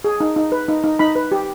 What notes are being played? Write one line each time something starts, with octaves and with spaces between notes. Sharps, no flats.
G#4
D#4
D#4
B4
D#4
D#4
D#4 B5
B4
G4